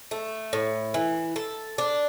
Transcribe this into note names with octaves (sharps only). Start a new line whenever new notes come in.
A3
A2
E3
A4
D4